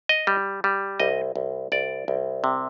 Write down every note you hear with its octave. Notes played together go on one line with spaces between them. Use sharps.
D#5
G3
G3
C2 D#5
C2
C2 D5
C2
C3